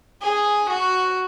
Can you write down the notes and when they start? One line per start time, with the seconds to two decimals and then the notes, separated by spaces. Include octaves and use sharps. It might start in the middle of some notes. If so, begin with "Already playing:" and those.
0.22 G#4
0.70 F#4